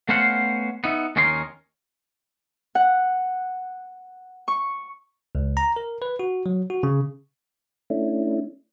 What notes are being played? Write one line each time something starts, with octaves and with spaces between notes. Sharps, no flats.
A3 B3 C#4 C5 F5 F#5
B3 D#4 E5
D#2 D#3 C#4 D#4 A#4 C6
F#5
C#6
C#2
A#5
A#4
B4
F#4
F#3
F#4
C#3
A3 C#4 D4 E4